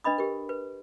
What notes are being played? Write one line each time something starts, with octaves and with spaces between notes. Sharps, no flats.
D4 B4 D#5 B5 D#6
G4 A#4
B4